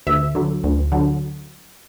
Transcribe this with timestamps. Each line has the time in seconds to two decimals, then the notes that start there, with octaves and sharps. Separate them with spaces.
0.07 D2 E5
0.35 D3 F#3
0.64 D2
0.92 D3 F#3